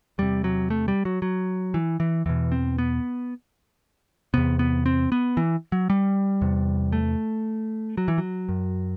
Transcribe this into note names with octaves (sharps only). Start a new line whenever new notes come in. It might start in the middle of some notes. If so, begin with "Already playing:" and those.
E2 C3 G3
F#3
A3
G3
F#3
F#3
E3
E3
E2 B2 E3
C4
B3
E2 C3 B3
B3
C4
B3
E3
F#3
G3
E2 C3
A3
F#3
E3
F#3
F#2